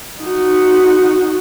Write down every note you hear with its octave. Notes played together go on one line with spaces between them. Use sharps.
D#4 F#4